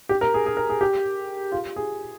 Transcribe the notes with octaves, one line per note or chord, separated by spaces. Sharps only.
G4
A#4
G#4
G#4
A#4
G#4
G4
F4
G#4